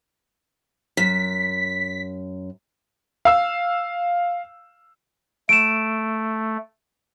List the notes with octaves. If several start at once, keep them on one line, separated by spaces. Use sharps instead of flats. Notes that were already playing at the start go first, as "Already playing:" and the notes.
F#2 B6
F5 E6
A3 D7 E7